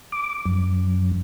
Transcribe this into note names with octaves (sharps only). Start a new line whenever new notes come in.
D6
F#2